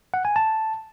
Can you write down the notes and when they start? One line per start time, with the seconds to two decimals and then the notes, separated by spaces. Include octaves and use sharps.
0.14 F#5
0.25 G#5
0.36 A5